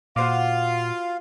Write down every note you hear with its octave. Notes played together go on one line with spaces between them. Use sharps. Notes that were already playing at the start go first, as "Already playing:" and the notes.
A#2 F4 F#4 C5 F5 D6